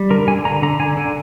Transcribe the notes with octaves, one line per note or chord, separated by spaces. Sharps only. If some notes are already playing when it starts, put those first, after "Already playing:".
Already playing: G3
D3 A#4
D3 G#5
D3 A#5
D3 A#5
D3 G#5
D3